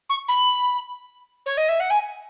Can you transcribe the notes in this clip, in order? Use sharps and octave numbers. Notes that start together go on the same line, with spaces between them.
C#6
B5
C#5
D#5
E5
F#5
G#5